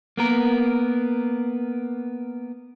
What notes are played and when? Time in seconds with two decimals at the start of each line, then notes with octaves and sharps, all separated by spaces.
0.17 A#3 B3 A#4